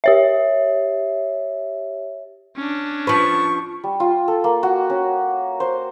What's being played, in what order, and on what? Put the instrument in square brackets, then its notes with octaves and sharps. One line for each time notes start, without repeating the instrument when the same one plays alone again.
[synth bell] G4 C#5 E5
[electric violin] C#4 D4
[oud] F3 B4 [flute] C#6
[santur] G3
F4
A4
A#3
F#4
C#4
C5